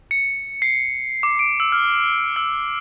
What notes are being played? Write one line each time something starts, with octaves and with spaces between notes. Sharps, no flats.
C#7
C7
D6
D7
E6
F6
E6